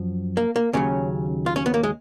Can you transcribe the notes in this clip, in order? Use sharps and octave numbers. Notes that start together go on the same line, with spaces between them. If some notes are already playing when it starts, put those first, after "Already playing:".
Already playing: F#2 F3
A#3
A#3
D#2 C#3 F#3 C#4
F4
C#4
B3
A#3
G#3